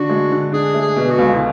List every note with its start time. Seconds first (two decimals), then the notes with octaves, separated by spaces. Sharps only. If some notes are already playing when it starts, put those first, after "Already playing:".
Already playing: D3 D4 F#4
0.10 G#3
0.32 D3
0.52 D4 G#4
0.74 A3
0.81 G#4
0.96 B2
1.10 F#4
1.18 C#2
1.34 E4